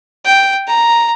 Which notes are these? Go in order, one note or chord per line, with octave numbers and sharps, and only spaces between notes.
G5
A#5